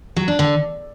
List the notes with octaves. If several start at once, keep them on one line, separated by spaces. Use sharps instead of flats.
F#3
D4
D3